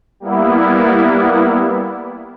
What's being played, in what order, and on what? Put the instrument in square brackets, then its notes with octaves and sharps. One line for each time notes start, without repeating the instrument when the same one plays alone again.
[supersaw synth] G3 A#3 B3 E4